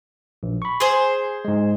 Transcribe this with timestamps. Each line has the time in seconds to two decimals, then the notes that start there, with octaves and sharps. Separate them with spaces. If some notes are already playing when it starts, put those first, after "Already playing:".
0.43 A#1
0.62 B5 C#6
0.80 G#4 C5 C6
1.45 G#2 G#3